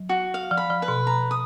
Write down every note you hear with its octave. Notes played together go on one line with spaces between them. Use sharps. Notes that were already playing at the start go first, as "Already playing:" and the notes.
Already playing: F#3
F#4
F5
F3
B5
F3
B4
B2
A#5
D#6